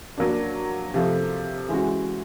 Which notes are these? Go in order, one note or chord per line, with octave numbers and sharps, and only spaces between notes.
F#3 A#3 D4
C3 F3 A3
E3 G#3 C#4 F#4